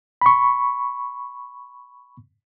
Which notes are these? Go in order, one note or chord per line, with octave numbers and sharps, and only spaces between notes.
B5 C#6